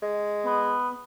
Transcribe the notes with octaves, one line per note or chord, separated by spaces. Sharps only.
G#3
B3